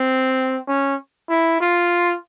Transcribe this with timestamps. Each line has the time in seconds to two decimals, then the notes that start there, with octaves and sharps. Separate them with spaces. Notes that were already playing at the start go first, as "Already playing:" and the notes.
Already playing: C4
0.68 C#4
1.29 E4
1.61 F4